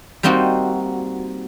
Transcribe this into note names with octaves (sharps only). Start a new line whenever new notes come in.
G3 A#3 C4 D#4 F#4